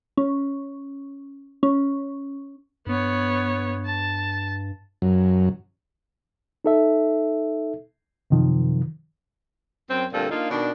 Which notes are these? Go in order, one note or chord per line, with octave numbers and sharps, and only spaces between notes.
C#4
C#4
G2 B3 C#5
A5
F#2
D#4 A4 E5
F#2 C3 D#3 F3
F#2 C4
D2 G2 A#2 C4 A4
A#3 D4 D#4 F4
B2 D#3 D4